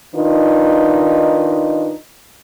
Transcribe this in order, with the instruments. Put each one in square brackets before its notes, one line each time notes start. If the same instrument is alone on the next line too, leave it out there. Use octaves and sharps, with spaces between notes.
[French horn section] D#3 D4 D#4 F4 B4 D#5